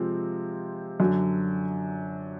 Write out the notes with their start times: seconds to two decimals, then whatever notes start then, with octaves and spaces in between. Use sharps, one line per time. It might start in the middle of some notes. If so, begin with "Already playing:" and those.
Already playing: C3 F3 G#3 C4 F4
1.00 F#2 D3 F#3